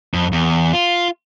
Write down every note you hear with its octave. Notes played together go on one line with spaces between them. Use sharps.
F2
E2
F4